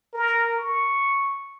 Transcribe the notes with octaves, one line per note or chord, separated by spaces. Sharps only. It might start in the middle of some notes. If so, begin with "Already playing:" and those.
A#4
C#6